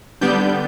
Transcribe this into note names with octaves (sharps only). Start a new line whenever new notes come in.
D3 G3 B3 D4 G6